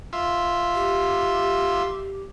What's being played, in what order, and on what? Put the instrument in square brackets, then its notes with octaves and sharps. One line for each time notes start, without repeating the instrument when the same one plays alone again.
[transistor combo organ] F4 E5
[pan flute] G4